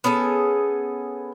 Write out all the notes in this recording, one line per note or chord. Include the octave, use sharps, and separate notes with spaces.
B3 C#4 G#4 A4